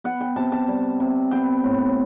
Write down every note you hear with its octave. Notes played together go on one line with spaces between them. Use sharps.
B3 F#5
G5
C3 A5
A5
G3
C3
B3 G5
A2